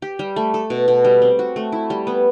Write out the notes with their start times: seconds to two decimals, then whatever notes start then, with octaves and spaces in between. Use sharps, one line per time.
0.02 G4
0.19 G3
0.36 A3
0.54 A4
0.70 B2
0.88 B2
1.04 G3
1.22 C4
1.39 F#4
1.56 A3
1.72 E4
1.90 G3
2.07 B3